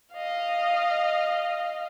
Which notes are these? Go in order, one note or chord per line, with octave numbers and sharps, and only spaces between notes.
D#5 F5